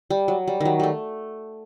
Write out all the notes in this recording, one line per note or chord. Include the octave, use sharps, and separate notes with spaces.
G3
F#3
G3
D#3 F#3
G3 A3